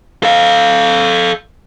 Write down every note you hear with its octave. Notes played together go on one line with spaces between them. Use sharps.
A4 F5